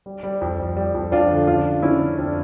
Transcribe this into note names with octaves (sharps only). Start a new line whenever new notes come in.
G3
G3
F2
F2
G3
F2
F2 D4 F4
D3
C#3 D4 F4
F3
C#3 C#4 E4
C#3
F2 D4